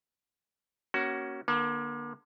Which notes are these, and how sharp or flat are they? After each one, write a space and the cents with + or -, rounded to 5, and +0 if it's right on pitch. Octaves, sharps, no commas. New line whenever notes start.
A#3 +20 C#4 +0 F#4 +20
D3 +20 A#3 +40